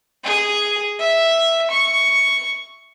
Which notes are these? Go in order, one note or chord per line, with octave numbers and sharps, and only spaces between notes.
G#4
E5
C#6